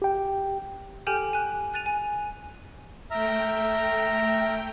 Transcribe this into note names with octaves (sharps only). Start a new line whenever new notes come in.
G4 G5
G4 A4 G5 G#5 F6 G6
G#5 F#6
F#6 A6 D#7 F7
G#5
A3 E5 G5 A#5 F6